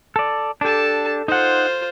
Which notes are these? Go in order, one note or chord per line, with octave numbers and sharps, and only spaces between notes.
A4 D5
D4 G4 A4 A5
D#4 F4 C5 F#5